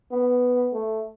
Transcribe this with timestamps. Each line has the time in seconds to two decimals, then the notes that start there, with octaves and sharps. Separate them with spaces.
0.12 B3
0.73 A3